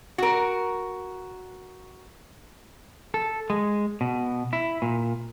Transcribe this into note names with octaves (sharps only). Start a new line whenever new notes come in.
F#4 A#4
A4
G#3
B2
E4
A#2